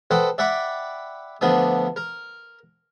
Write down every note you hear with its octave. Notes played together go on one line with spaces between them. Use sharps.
A4 B4 C5 D#5 F#5 G5
D5 E5 F#5 G5 B5 D6
D2 F3 B3 D4 D#6
A#4